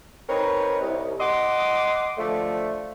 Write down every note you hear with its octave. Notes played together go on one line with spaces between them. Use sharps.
C4 D#4 A#4 B4 C#5
C2
D#5 F#5 C6 D6 D#6
D3 F3 A3